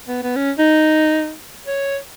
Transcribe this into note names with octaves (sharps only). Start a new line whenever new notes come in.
B3
B3
C#4
D#4
C#5